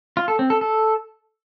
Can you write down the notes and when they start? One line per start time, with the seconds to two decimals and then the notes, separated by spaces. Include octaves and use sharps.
0.17 F4
0.28 A4
0.39 C4
0.50 A4
0.61 A4